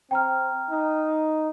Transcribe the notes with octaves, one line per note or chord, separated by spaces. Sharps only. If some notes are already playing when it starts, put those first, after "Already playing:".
C4 G5 A#5 F6
D#4